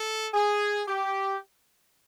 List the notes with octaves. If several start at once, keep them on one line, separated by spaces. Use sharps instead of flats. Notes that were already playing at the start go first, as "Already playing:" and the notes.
Already playing: A4
G#4
G4